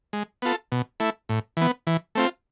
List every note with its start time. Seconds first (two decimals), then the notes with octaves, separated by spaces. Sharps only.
0.13 G#3
0.42 B3 F4 A4
0.72 B2
1.00 A3 E4
1.29 A2
1.57 E3 B3
1.87 E3
2.15 A3 C4 F4